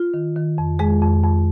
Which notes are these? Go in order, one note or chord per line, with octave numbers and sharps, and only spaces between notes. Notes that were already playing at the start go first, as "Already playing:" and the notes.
Already playing: F4
D#3
D#3
F2
F2 G#3 G#4
F2
F2